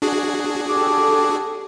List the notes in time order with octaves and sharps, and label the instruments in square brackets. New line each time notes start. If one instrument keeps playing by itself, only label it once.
[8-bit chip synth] D4 F#4 G#4
[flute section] G4 A4 A5 [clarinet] D6